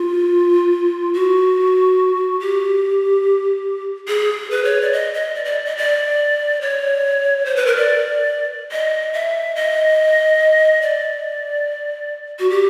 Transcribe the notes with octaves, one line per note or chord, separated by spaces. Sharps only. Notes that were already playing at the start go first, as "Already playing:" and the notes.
Already playing: F4
F#4
G4
G#4
B4
C#5
D5
D#5
D#5
D5
D5
D#5
D5
C#5
C5
B4
A#4
D5
D#5
E5
D#5
D5
F#4
G4